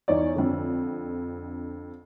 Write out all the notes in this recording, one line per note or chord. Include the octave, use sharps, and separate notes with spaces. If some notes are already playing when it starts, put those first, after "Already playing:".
E2 D#4 C#5 D5
F2 D3